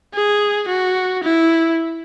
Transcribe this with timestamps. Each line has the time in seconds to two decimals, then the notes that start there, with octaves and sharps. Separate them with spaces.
0.14 G#4
0.68 F#4
1.23 E4